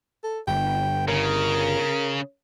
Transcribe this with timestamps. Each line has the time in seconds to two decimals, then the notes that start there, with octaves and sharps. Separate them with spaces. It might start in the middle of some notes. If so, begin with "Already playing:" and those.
0.24 A4
0.48 G1 G5
1.08 C#3 A#4